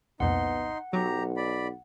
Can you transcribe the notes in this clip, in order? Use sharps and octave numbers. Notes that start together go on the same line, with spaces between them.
C2 F2 A#2 B3 D#4 F#5 C6
B1 F#3 G4 A#5
D5 B5